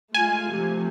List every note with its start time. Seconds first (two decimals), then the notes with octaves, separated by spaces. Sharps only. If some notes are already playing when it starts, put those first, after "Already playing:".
0.15 G#3 A3 F4 G#5
0.51 C3 F3 A3